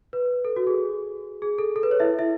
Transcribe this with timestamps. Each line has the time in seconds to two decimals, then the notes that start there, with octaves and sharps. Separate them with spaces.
0.13 B4
0.45 A4
0.56 F#4
0.67 G#4
1.42 G#4
1.59 A4
1.76 A4
1.83 B4
1.91 C#5
2.00 E4 E5
2.19 E4 E5